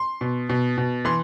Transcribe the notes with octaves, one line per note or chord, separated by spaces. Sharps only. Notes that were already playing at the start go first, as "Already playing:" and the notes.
Already playing: C6
B2
B2
B2
E3 C6